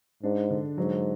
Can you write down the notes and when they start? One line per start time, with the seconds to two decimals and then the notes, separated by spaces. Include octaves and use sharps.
0.23 G#2 D4
0.50 D3
0.77 G#2 F#3